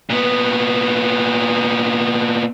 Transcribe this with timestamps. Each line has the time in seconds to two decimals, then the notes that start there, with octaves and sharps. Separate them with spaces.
0.10 A#2 B3